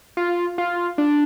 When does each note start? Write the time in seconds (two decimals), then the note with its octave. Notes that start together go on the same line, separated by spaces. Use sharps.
0.17 F4
0.58 F4
0.98 D4